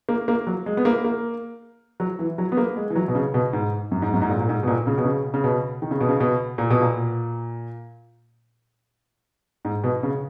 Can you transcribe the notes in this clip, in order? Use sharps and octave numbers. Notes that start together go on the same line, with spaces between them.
A#3
A#3
F#3
G#3
B3
A#3
A#3
F#3
E3
F#3
B3
A#3
G#3
E3
F#3
B2
C#3
B2
G#2
F#2
G#2
F#2
G#2
A#2
A#2
G#2
B2
A#2
C#3
B2
C#3
C#3
B2
D#3
C#3
B2
C#3
B2
A#2
B2
A#2
G#2
B2
C#3